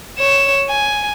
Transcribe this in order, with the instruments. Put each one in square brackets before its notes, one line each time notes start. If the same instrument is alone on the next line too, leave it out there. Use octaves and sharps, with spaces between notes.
[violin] C#5 E7
G#5